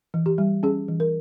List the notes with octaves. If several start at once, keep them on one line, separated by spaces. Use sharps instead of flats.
E3
G4
G3
C#4 G#4
E3
A#4